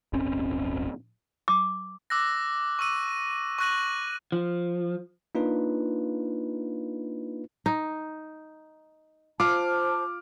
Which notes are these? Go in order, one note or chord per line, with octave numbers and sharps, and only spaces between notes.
D1 G1 C4 C#4
D6
D6 E6 F#6 A#6
C#6 D6 E6 D#7
C#6 E6 F#6 A#6 D#7 F#7
F3
A#3 D4 D#4 F4 B4
D#4
F4 C5 A5 D6 F6